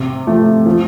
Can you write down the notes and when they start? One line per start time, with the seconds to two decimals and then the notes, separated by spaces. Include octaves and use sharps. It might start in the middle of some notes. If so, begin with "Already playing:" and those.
Already playing: C3
0.27 F3 A3
0.66 F3